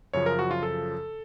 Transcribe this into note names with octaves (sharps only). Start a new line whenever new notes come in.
F#2 C#3 F3 C#5
A#4
F#4
F4
A4